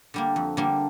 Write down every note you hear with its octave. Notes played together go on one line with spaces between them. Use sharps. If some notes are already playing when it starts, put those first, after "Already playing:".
D3 G3 A#3
F2
D3 G3 A#3